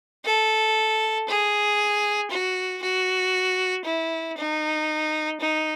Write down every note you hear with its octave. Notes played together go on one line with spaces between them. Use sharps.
A4
G#4
F#4
F#4
E4
D#4
D#4